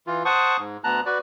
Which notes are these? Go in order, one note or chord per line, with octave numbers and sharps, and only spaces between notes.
E3 F4
C5 F#5 A5 C#6 D#6
G#2
D2 B3 A5 A#5 F#6
F#4 B4 D5